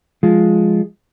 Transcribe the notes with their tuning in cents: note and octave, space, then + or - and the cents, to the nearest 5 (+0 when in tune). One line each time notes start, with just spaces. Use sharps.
F3 +0 G#3 +0 F4 +0